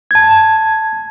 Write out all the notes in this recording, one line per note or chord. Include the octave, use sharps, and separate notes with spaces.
A5 G#6